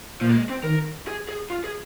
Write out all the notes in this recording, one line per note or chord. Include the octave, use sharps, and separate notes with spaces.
A#2 F3
A#3
G#3
C4
D#3 A#4
G#4
G#4
F4
G#4